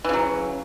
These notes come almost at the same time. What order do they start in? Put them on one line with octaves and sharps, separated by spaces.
E3 C#3 F#3